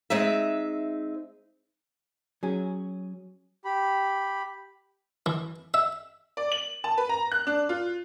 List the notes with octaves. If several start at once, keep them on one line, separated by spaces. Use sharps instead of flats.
G#3 C4 D#4 E5
F#3 C#4 G#4
G4 B5
E3
E5
D5
F#7
A5
B4
A#5
F#6
D4
F4